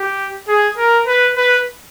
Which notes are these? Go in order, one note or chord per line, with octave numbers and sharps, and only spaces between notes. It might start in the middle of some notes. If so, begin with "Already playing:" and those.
Already playing: G4
G#4
A#4
B4
B4